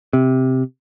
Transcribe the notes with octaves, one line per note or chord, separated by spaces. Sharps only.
C3